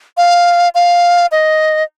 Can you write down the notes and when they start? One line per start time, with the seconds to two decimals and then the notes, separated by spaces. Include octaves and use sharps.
0.17 F5
0.75 F5
1.32 D#5